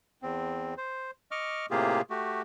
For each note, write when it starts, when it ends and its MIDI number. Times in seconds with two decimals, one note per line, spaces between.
0.22 0.74 40
0.22 0.74 60
0.78 1.11 72
1.31 1.66 75
1.31 1.66 85
1.31 1.66 86
1.31 1.66 89
1.71 2.01 45
1.71 2.01 48
1.71 2.01 58
1.71 2.01 65
1.71 2.01 67
1.71 2.01 68
2.10 2.42 57
2.10 2.42 66
2.10 2.42 67